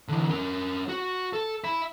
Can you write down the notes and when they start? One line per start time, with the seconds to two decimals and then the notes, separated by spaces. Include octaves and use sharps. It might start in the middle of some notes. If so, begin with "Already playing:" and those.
0.09 D3 E3
0.29 C#4 A#4
0.89 F#4
1.33 A4
1.64 E5 B5